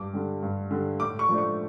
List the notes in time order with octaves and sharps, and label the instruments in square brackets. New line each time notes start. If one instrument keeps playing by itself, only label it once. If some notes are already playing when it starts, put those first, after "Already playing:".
Already playing: [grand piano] G2 D6
D3 G3
G2
D3 G3
A2 D6
C#6
F3 A3 D4
C#6